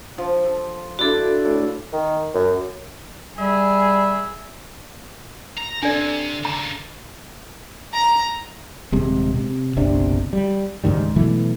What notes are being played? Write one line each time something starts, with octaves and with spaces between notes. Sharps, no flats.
F3
A4
D4 E4 F#4 A4 D5
A2
D#3
F#2
G3 G#4 E5
A#5
C3 D4 A4 D5
C#3 D4 A#5
A#5
D#1 C3 G#3
C3
F#1 B1 C3 D4
G3
C#2 G#2 D#3 G3
B2 E3 F#3 A3